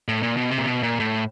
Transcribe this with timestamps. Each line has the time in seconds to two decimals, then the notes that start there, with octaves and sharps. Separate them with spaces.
0.08 A2
0.23 A#2
0.37 B2
0.50 C3
0.58 A#2
0.67 B2
0.83 A#2
1.00 A2